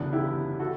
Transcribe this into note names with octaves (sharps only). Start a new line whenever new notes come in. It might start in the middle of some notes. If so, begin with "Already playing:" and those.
Already playing: G1 F#2 C#3 E3 B3 D4
E4 G4
F#4 A4